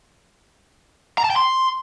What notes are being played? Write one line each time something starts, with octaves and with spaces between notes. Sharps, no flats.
A#5
A5
G5
C6